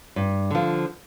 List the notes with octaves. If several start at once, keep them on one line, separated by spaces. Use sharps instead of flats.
G2
D3 F3